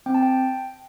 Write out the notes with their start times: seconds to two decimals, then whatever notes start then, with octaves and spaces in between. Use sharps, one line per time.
0.06 C4 G5
0.14 A5
0.23 G5